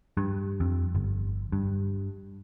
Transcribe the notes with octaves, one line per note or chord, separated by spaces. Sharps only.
G2
F2
G1
G2